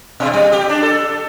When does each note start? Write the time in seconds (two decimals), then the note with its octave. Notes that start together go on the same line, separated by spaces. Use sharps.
0.20 B2
0.34 G3
0.52 G4
0.69 D4
0.83 A4